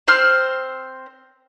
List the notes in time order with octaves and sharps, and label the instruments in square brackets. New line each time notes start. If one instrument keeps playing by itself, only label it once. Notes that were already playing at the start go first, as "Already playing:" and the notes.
[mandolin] C4 C5 F6